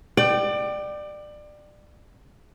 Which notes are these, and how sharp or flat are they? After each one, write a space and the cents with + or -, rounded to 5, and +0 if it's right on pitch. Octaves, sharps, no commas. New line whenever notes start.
D5 +25 G5 -15